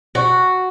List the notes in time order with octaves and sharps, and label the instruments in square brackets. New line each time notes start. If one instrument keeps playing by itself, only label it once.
[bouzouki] F#4